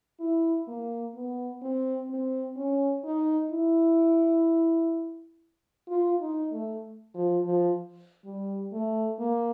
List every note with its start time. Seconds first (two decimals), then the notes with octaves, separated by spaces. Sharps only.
0.20 E4
0.67 A#3
1.15 B3
1.62 C4
2.10 C4
2.56 C#4
3.04 D#4
3.51 E4
5.88 F4
6.20 D#4
6.52 A3
7.14 F3
7.46 F3
8.25 G3
8.72 A3
9.19 A#3